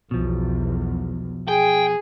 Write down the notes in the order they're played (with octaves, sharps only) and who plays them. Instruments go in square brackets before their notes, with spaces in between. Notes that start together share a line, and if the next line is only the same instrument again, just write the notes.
[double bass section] B1 E2 [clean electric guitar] B2 F3
[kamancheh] G#4 [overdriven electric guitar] G5